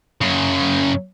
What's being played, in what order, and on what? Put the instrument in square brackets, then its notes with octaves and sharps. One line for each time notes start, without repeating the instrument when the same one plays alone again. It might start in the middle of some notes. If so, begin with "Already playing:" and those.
[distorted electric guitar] F#2 C#3